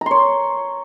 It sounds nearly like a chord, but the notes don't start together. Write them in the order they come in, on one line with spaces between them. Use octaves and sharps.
A#5 C6 C#5